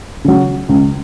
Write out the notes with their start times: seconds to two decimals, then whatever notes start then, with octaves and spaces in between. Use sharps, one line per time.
0.25 C#3 F#3
0.69 C#2